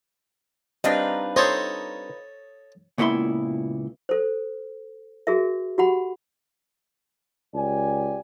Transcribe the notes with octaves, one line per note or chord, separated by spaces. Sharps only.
G3 C4 D4 D#4 F4 B4 D#5
A4 C5 C#5 D#5
C#2 A#2 B3 E4 C6
A4 C5
F#4 G#4 A#4 E5
F#4 G4 F#5 B5
C#2 G4 D5 G#5